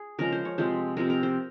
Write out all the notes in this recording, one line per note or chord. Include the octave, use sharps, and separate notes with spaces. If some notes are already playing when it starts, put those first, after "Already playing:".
Already playing: G#4
C#3 F3 G#3 A#4
C5
C#5
C3 F3 G#3 C5
C3 F3 G#3 A#4
A#4
C5